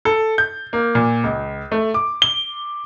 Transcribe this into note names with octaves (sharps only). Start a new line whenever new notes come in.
A4
G6
A#3
A#2
C#2
A3
D6
G7